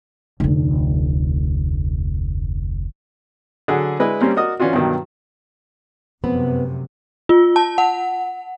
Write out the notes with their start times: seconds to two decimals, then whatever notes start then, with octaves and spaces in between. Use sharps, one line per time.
0.40 F1 D2
3.68 D3 F#3 G#4 F#5
4.00 G#3 D4 E4 B4 D#5 G#5
4.21 G3 A#3 C4 C#4 G4
4.37 F#4 A#4 D5 D#5 D#6
4.60 E3 C#4 D4 F4 F#4
4.73 G2 B2 D#3 F#3
6.24 F1 F#2 C3 B3 C4 B4
7.29 F4
7.56 A5
7.78 F#5